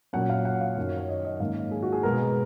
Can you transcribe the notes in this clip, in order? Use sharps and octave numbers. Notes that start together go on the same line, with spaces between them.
A#2 F#3 C#4 F#5
F5
F#5
F5
F#2 D#3 F#3 C#4
C#5
D#5
D#5
G#2 D#3 A#3 C#4 F5
G#4
F#4
G#4
B2 G#3 B3 A#4